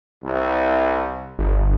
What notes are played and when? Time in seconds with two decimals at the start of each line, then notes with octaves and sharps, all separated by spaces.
0.24 C2
1.39 G1